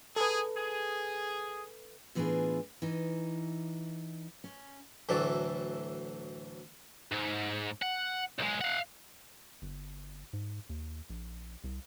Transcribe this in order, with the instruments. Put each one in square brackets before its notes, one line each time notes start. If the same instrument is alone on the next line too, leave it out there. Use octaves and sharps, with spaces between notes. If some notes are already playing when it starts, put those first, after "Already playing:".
[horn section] G#4 [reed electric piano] A4 B4
[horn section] G#4
[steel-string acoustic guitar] A2 E3 B3 D4 F4 G#4
E3 D#4
C#4
[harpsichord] D2 A2 E3 F#3 D5
[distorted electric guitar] G#2
F#5
B1 G#3
F5 F#5
[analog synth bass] G1
G#2
D#2
A#1
C2